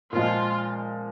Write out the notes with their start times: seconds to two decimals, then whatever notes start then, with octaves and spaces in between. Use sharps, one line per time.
0.12 A#2 F3 G#3 F4